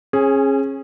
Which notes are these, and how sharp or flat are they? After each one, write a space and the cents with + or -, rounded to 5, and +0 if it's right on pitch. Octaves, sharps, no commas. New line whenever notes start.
C#4 -30 G#4 +0